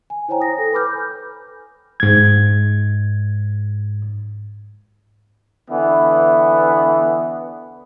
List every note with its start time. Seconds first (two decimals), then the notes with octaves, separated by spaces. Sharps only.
0.10 G#5
0.28 E4 C5 C#5 G5 G#5 A#5
0.40 D#6 A#6
0.58 A4
0.72 B4 G#5 B5 D6 F6 G6
2.00 G#2 G#6
5.69 D3 E3 B3